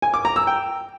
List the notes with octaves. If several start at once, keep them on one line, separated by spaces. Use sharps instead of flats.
G#5
D6
A#5
E6
G5